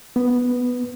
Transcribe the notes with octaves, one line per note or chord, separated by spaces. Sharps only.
B3